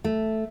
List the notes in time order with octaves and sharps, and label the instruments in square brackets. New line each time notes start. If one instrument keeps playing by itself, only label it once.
[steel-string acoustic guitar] A3